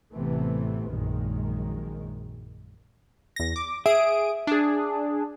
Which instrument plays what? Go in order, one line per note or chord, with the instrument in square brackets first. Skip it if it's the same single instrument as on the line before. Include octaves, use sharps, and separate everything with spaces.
[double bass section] A1 C3 E3 A3 B3
A#1 F#2 D#3 G#3
[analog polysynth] E2 A#6
D6
[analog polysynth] G#4 D#6 D7 [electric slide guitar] E5
[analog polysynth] D4 G#4